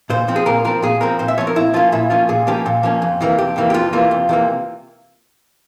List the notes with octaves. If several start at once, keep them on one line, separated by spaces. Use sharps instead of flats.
A#2 C5
F3 C4
G#4
A#2 A#4
F3 C4 A#4
A#2 G#4
F3 C4 A#4
A#2 C5
E5
F3 C4 C#5
A#4
A#2 E4
F3 A#3 C#4 F4
A#2 E4
F3 A#3 C#4 F4
A#2 G#4
F3 A#3 C#4 G4
A#2
F3 A#3 C#4
F2
C3 E3 A#3
F2 G4
C3 E3 A#3
G4
F2 F4
C3 E3 A#3 F4
F2
C3 E3 A#3